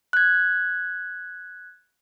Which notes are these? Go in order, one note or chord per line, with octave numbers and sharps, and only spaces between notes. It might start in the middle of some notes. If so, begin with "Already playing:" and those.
F#6 G#6